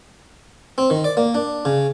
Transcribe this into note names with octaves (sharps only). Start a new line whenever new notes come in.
C4
D#3
D5
A#3
D4
C#3